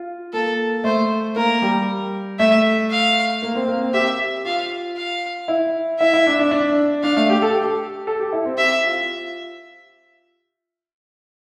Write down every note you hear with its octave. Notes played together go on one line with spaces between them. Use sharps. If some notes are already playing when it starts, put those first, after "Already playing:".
Already playing: F4
A#3 A4
A3 C5
A#3 A#4
G3
A3 E5
F5
A#3
C4
A#3
C4
G4 E5
F4 F5
F5
E4
E4 E5
E4
D4
D4
D4
D4 F5
A3
G4
A4
G4
A4
G4
E4
C4
G4 E5
F4